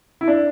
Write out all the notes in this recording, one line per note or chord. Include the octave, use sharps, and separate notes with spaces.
E4
D4